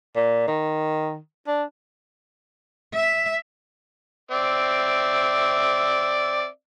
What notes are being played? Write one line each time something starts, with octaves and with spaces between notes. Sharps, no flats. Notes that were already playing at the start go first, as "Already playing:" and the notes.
A#2
D#3
D4
E5
C4 D5 E5